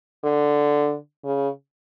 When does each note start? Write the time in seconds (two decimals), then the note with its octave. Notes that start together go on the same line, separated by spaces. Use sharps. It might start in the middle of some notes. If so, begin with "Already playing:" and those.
0.24 D3
1.24 C#3